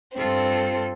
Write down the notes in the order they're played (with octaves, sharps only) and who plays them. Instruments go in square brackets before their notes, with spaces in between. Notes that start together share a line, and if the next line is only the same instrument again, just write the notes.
[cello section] G2 F4 A4 [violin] C4